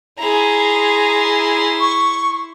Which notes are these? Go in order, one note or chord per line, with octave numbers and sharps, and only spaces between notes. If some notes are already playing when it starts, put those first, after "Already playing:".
E4 G#4 A#5 C6
C#6